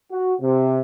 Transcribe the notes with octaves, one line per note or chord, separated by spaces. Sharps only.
F#4
C3